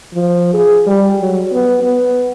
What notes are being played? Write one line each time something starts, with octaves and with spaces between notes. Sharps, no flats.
F3
G#4
G3
F#3
B3
B3